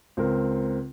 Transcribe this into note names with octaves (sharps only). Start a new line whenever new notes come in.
C#2 C4 A#4